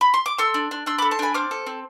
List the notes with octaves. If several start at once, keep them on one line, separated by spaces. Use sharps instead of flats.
B5
C6
D6
A4 C6 E6
D4
D4
D4 C6 E6
B5 D6
A4
A5 C6
D4 G#5 B5
C4 D6 F6
A4
C4